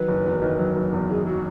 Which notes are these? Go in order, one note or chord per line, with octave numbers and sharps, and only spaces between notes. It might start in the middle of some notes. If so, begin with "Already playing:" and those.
Already playing: D#3 F#3 B4
F#1
E2
D#3
F#3
F#1
E2
D#3 G#4
F#3 F#4